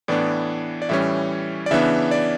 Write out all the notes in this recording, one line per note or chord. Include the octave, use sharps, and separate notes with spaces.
A2 E3 B3 D4 D5
D5
A2 E3 G3 C#4 E5
D5
C#3 E3 B3 D4 E5
D5